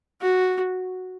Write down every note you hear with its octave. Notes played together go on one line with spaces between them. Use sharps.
F#4